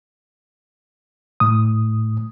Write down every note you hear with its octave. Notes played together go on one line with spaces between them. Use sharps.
A2 D#6